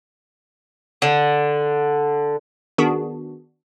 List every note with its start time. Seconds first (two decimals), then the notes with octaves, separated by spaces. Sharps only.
1.02 D3
2.78 D#3 B3 D4 F#4 G#4